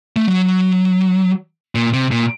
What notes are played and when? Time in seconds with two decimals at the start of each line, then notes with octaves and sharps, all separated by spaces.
0.16 A3
0.27 F#3
1.75 A#2
1.93 C3
2.11 A#2